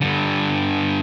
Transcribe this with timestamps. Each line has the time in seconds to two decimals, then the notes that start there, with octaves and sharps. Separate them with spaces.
0.01 G2 D3